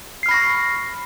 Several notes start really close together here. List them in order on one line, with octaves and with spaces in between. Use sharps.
C7 F6 B5 A#6 C#6